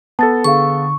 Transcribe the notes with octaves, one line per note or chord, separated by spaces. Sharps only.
B3 A4 A5 A6
D3 G#4 F5 C#6